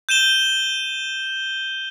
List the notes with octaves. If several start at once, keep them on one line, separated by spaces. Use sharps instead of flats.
G6 D#7 E7 G7